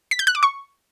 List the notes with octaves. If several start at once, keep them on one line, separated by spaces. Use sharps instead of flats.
B6
G6
F#6
D6
C#6